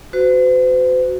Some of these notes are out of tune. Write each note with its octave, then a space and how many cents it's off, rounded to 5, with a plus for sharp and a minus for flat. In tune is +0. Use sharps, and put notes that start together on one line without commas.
F#4 +0 C5 -45